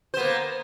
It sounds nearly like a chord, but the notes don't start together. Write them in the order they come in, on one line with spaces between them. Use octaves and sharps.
C5 B3 A#3